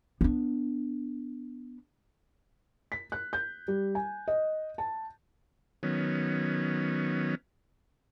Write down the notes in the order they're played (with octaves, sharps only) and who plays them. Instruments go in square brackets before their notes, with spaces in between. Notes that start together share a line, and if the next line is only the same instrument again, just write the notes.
[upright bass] B3 D4
[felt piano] B6
F#6
G6
G3
G#5
D#5
A5
[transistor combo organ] D#3 F#3 B3 C#4